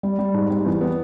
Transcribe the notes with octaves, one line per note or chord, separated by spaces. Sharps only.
G3
G3
G#2
G3
E2
B3